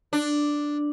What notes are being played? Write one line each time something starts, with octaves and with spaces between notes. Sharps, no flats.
D4